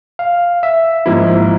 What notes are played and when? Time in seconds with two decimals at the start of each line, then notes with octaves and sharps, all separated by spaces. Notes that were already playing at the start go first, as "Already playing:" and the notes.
0.19 F5
0.63 E5
1.06 G#2 F3 A#3 E4